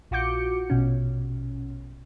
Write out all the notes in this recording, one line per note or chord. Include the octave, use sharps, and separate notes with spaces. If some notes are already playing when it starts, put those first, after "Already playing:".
A#1 F4 F#4 D6 G6 C#7
A#1 B2 C#4